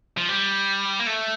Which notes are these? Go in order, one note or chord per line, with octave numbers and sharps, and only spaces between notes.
F3
G3
A#3
A3